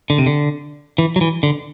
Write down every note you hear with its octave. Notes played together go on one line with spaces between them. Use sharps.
D3
C3
D3
E3
F#3
E3
D3